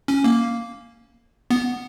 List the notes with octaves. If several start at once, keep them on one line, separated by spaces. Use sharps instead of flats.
C#4
A#3
B3